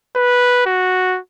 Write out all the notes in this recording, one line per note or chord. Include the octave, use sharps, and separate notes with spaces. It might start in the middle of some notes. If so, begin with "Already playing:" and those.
B4
F#4